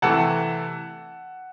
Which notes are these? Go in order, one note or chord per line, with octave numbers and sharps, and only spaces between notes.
C3 E3 A3 F#5 A5